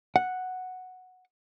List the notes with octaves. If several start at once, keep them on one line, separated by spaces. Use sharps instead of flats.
F#5